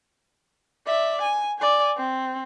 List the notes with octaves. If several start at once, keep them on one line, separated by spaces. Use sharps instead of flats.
D5 E5
G#5
D5 G#5
C4